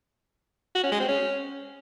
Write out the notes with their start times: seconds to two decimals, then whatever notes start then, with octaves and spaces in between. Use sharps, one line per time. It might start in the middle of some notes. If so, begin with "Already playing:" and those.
0.75 F#4
0.83 C#4
0.92 G#3
1.00 C4
1.08 C#4